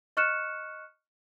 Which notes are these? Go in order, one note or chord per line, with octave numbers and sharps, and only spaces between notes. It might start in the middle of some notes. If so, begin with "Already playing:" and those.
D#5 C#6 F6 F#6 C#7 E7